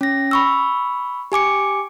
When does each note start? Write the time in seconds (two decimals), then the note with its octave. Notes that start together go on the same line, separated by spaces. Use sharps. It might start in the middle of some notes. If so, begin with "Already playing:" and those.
0.01 C#4 A#6
0.31 B5 C#6 E6
1.32 G4 G#5 D6 C#7